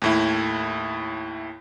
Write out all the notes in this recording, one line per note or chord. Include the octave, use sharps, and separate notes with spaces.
D#2 A2 E4